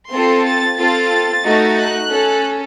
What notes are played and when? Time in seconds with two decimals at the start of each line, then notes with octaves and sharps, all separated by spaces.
0.12 C4 F4 A4 C6
0.44 A6
0.77 C4 F4 A4 A6
1.42 A3 D#4 F#4
1.76 F#6
2.08 C#4 A4